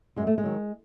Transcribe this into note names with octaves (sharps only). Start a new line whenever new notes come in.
F#2 G#3
A3
G#3
D#3 F#3